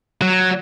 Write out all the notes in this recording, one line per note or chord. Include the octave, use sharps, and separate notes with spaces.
F#3